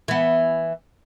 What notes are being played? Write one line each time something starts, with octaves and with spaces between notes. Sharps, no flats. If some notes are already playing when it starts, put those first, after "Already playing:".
E3 B3